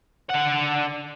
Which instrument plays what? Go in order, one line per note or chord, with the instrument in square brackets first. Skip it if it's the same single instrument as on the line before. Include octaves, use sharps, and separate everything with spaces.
[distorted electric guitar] D3 F#5